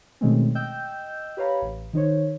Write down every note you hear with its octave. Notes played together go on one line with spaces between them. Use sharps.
B2 D#3 G#3 A3 C4 C#4
D#5 G5 E6 G6
G4 B4 C#5 F5 A#5 B5
A1
D#3 D#4 C5 C#5